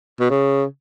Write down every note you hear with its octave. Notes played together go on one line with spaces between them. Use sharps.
B2
C#3